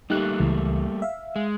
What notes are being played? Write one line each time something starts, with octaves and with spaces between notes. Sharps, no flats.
G3 A3 A#3 D#4 G4 F#6
C#2 E3
E5 F5
G#3